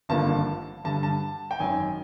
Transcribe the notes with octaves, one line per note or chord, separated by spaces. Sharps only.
G#1 G2 D3 F3 A#3 A5
G2 D3 G3 A5
A5
G5
G#1 F#2 D#3 G#5